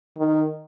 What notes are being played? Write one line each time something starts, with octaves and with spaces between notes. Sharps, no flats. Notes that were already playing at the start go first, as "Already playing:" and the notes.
D#3